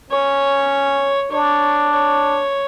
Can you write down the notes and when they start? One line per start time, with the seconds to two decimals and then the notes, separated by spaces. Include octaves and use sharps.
0.10 C#4 C#5
1.32 D4 C#5
1.93 C#5